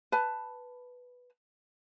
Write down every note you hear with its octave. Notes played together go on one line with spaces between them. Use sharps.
B4 A5